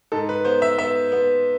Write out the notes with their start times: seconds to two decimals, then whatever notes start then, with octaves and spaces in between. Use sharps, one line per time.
0.12 G#2 A4
0.29 B4
0.45 B3 C5
0.62 E5
0.78 B3 E5
1.12 B3